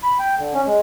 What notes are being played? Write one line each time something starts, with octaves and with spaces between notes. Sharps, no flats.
B5
G5
D3
C#4
G#3